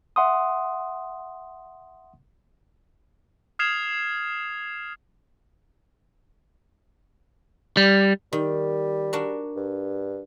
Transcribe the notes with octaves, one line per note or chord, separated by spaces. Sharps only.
E5 F#5 C6 D#6
D#6 F6 G#6 C7 E7 F7
G3
D#3 G3
D4 F#4 A#4
G2